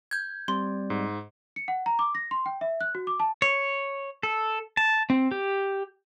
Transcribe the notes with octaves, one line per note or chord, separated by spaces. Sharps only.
G6 G#6
G3 C4 D5 C6
G#2
C#7
F#5
A#5
D6
A#6
C6
G5
E5
F#6
F#4
D6
A5
C#5
A4
A5
C4
G4